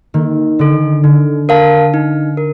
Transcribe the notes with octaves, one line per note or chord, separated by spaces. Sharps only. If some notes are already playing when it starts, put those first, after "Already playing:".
D#3 A#3
D3 D4 A4 D#5
D3 D#4
A#4 F5 A5
D#4
A#4